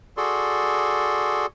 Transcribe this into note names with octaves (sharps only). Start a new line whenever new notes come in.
F#4 G#4 A4 D5 C6